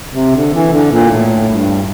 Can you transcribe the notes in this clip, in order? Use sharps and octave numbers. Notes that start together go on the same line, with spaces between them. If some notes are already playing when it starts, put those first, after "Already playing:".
C3
D3
E3
D3
A#2
A2
G2